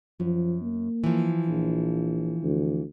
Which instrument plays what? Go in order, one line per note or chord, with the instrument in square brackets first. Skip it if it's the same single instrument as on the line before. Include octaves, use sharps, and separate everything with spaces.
[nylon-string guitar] F#2 [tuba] F3
[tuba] A#3
[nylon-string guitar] E3 F3
[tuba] A#1
D2